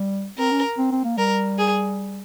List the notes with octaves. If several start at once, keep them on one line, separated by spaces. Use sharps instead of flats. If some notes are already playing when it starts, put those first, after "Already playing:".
Already playing: G3
C4 A#4
C#4
C4
C4
A#3
G3 A#4
G#4